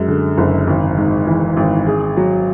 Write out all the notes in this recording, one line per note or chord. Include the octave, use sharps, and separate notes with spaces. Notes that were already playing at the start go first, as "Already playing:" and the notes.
Already playing: F#2 G#3
D3
F#1
G#1
G#2
E3
G#1
G#4
F#3